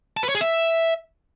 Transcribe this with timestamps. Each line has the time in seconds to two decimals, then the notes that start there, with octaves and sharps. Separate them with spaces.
0.17 A5
0.23 B4
0.29 C#5
0.35 G#4
0.41 E5